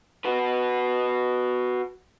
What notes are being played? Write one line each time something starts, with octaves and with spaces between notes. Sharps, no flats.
F#4 B4